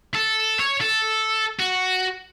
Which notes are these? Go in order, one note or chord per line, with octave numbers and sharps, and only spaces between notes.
A4
C#5
A4
F#4